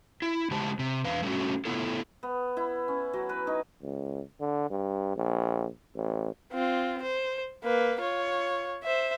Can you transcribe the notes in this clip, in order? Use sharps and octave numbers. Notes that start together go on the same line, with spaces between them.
E4
C#3 G#3 G4 C5 A5
C3
E2 B4 F5
G3 A3 C#4 F4 F#4
A3 B3 E4 F4 A4
B3
E4
C#4
F#3
B4
D#4
C#2
D3
G2
A#1
A1
C4 F4
C5
A#3 B4
F4 C#5
C5 E5